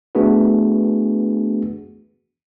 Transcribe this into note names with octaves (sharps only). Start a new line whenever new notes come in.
A3 B3 D4 F#4 G#4 B4